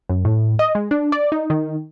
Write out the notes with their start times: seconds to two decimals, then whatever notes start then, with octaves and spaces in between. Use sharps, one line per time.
0.09 F#2
0.25 A2
0.59 D#5
0.75 G#3
0.91 D4
1.12 D5
1.32 D#4
1.50 D#3